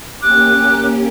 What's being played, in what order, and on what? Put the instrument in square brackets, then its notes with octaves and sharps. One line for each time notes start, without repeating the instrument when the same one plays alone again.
[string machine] A#3 C#4 G4 [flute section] D6 F#6